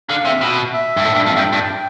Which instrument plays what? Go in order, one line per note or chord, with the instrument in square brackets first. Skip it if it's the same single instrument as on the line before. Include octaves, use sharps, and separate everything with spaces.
[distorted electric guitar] D3 [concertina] F5
[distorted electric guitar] C3 [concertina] E5
[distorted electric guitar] B2
[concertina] E5
[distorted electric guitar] G2
A2
G2
[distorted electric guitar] F2 [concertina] F5
[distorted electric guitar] G2 [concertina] G5
[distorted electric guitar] G2 [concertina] A5
[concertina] A5
G5